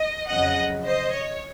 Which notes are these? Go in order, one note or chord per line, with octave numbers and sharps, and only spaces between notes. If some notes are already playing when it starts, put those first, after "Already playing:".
Already playing: D#5
F2 C#3 F#3 D#5 F#5
C5 D#5
C#5